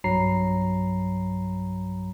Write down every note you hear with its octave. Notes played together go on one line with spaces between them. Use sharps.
B1 G2 F#3 A#5 B5 C7